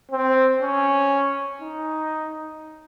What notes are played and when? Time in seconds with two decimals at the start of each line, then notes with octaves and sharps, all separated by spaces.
0.12 C4
0.62 C#4
1.61 D#4